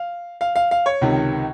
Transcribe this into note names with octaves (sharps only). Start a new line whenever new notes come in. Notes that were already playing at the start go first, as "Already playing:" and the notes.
Already playing: F5
F5
F5
F5
C#5
C#2 C3 D#3